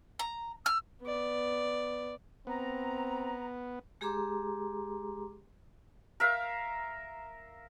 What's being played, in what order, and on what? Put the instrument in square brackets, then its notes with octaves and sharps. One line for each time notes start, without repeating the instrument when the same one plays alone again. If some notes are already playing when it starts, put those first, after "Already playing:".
[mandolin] A#5
[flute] E6 [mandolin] F6
[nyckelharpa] B3 D5
[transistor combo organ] B3 [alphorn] C4 [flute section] A#5
[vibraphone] G#3 G4 G#4 A#5 C6 D6
[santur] A#4 E5 F5